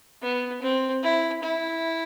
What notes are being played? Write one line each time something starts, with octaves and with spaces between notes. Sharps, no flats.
B3
C4
E4
E4